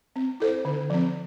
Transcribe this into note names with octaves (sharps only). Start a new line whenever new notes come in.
C4
E4 A4 C5
D3
F3 C4